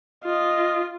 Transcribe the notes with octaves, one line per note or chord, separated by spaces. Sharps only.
F4 D#5